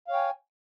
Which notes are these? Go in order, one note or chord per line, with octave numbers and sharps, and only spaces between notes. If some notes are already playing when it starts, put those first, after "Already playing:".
C#5 F5 G5 G#5